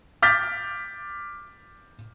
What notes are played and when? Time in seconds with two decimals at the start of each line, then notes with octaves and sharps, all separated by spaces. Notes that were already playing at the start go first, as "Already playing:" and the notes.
0.22 D6 F6 G6 A6 B6